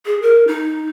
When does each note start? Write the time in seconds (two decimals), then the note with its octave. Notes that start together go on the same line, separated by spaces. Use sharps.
0.06 G#4
0.22 A#4
0.47 D#4